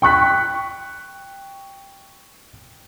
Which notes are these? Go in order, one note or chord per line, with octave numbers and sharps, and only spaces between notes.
G5 C#6 F#6 B6